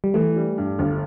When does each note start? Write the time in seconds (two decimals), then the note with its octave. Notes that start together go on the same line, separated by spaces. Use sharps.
0.04 G3
0.14 E3 A3
0.36 G3
0.58 G2
0.79 G1